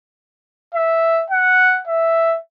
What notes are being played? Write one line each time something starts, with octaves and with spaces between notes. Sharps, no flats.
E5
F#5
E5